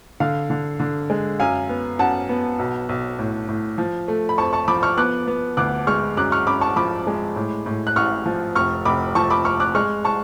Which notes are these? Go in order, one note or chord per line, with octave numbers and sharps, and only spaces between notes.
D3 F5
D3
D3
G#3
F#2 F5 G#5
B3
F#2 F#5 A5
B3
B1
B1
A2
A2
F3
A3
B5
F2 A5 C#6
A5 C#6
F3 B5 D6
C#6 F6
B3 D6 F#6
B3
D2 D6 F#6
G#3 C#6 F6
F#2 D6 F#6
C#6 F6
F#2 B5 D6
A5 C#6
F3 B5 D6
G#3
A2
A2
F#6
A1 C#6 F6
F3
F1 C#6 F6
F1 B5 D6
F3 A5 C#6
B5 D6
F1 C#6 F6
D6 F#6
G#3 C#6 F6
A5 C#6